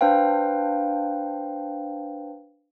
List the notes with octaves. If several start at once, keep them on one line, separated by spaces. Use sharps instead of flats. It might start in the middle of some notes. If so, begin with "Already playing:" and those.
D4 B4 C5 F5 G5